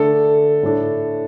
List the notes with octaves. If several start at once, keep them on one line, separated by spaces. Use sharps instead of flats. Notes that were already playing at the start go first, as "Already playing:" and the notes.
Already playing: D3 A3 D4 A4
A2 A3 D4